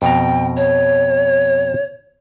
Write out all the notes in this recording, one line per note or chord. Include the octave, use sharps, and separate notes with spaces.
F2 B2 G5 A#5
C#5